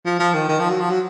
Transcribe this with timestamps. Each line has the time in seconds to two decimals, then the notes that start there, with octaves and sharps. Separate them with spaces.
0.05 F3
0.19 F3
0.34 D#3
0.49 D#3
0.59 F3
0.69 F#3
0.80 F3
0.90 F#3